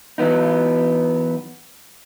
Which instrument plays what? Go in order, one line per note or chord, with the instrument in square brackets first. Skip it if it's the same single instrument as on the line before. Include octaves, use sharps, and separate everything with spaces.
[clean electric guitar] E3 F#3 B3 D#4